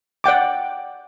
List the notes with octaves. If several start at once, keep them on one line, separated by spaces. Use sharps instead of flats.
D5 F#5 G5 D6